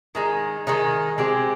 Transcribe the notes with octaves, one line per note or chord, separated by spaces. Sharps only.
D#3 G#3 D#4
D#3 G#3 D#4
G#3 C4 G4